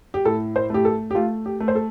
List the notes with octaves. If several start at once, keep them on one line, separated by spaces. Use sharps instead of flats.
G4
A2 A4
C5
A3 G4
A4
G4
A3 F4
G4
A3
C5
A4